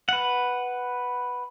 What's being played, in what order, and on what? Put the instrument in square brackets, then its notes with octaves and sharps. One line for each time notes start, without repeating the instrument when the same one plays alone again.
[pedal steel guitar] B4 F#5